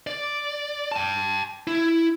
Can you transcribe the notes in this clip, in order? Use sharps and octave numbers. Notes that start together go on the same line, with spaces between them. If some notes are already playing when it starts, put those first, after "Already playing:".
D5
G5 A5
E4